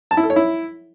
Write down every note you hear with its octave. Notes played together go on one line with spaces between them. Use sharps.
A5
E4
A4
C#5
E4